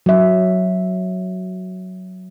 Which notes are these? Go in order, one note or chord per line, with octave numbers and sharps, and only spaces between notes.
F#3 E5